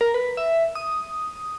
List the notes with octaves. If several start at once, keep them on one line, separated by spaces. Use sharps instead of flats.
A#4
B4
E5
D#6